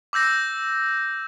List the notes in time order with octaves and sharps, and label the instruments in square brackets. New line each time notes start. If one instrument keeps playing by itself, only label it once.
[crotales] D6 E6 G6 A#6